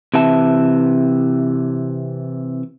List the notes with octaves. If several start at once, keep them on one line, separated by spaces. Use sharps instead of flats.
C3 E3 E5 A5